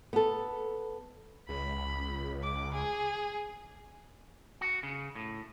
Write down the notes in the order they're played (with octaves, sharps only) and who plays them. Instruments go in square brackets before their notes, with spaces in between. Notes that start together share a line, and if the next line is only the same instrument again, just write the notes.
[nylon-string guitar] B3 A4
[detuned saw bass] C#2 [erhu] B5
[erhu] D6
G#4
[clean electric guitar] F#4
C#3
A2